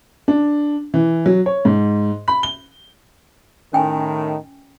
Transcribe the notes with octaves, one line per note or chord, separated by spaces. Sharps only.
D4
E3
F#3
C#5
G#2
B5
G7
A2 D#3 C#4 G5 G#5